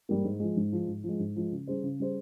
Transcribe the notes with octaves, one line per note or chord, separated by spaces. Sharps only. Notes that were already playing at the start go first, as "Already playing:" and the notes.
G#2 G3 A#3
G#2
F3 G#3
G#2
F3 G#3
G#2
F3 G#3
G#2
F3 G#3
C#3
G3 C#4 G#4 C5
C#3
G3 C#4 G#4 C5